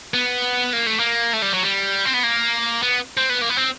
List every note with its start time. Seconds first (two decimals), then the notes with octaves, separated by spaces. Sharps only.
0.14 B3
0.73 A#3
0.86 A3
0.99 A#3
1.33 A3
1.42 G3
1.53 F#3
1.63 G3
2.05 C4
2.14 B3
2.23 A#3
2.82 B3
3.17 C4
3.30 B3
3.42 A#3
3.50 B3
3.57 C4